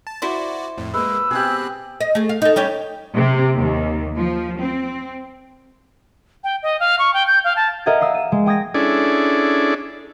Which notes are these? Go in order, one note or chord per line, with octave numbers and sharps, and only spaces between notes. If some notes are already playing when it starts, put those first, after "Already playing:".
A5
E4 F#4 C5 D5
F2 A2
G#3 A#3 B4 E6
B2 C4 G4 G#4 F#6
D#5
A3 G#4
F5
D#4 A4
G3 C#4 G4
C3
D#2
F3
C4
G5
D#5
F5
C#6
G5
G6
F5
A5
A#4 D#5 E5 F#5 G#6
F5 D#6 E6
D#7 E7
G#3
G5 D#6 G#6 A#6
C#4 D4 E4 G#4 A4 D5